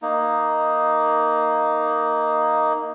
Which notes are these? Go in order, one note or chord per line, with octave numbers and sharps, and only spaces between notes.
A#3 D#4